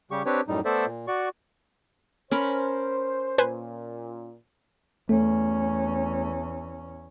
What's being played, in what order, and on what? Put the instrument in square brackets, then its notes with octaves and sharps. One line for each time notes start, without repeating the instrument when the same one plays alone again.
[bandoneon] C#3 G3 G4 C#6
C4 D4 G4 B4 C#5
F#2 A2 G3 D#4
A3 B3 A4 C5 D5 E5
A#2
F#4 D5 C#6
[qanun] C#4 A#4 B5 [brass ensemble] C5
[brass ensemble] A#2 [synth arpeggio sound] B4 C5 G#5
[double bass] E2 C#4 [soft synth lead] A3